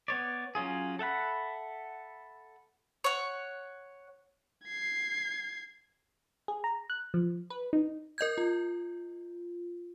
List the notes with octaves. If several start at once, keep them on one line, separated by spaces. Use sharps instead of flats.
B3 C#5 D5
F#3 C#4 F4 G#4
A4 E5 F#5 B5
C#5 F#5
G#6 C7
G#4
A#5
F#6
F3
B4
D#4
A#4 D#5 G6 G#6
F4